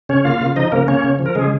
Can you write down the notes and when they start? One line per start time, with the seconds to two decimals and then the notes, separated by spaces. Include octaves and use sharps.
0.09 C#3 C#4 C#5
0.25 A#3 F4 F5
0.41 C#3
0.56 F3 D#4 D#5
0.72 C#3 A#3 A#4
0.88 A#3 C#4 C#5
1.04 C#3
1.19 F3
1.26 A#4
1.35 C#3 G#3 G#4